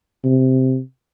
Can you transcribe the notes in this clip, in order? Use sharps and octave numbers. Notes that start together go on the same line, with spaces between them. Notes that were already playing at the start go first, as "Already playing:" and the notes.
C3